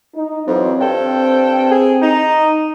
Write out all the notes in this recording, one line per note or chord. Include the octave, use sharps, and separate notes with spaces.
D#4
F2 E3 F#3 C4
G2 C4 A4 G5
G#4
D#4